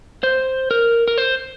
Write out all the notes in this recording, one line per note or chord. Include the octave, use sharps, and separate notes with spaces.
C5
A#4
A#4
C5